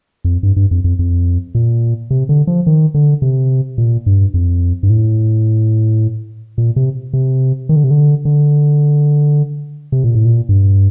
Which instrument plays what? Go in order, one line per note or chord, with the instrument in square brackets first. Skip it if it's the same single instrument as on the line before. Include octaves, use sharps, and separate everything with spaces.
[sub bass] F2
G2
G2
F2
F2
F2
A#2
C3
D3
F3
D#3
D3
C3
A#2
G2
F2
G2
A2
A#2
C3
C3
D#3
D3
C3
D3
D3
C3
A#2
A2
A#2
G2